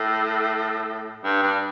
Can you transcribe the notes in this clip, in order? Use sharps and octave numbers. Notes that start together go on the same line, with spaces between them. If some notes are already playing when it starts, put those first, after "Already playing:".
Already playing: A2
G2
G2